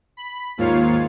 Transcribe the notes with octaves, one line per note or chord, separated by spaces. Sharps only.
B5
D#2 G#2 A#3 F4 C#5 F5